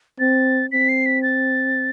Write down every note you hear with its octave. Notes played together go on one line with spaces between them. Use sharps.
C4 A6
C4 B6
C7
B6
A6